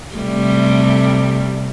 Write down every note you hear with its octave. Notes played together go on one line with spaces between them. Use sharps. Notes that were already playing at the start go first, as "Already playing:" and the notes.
C3 G3 A3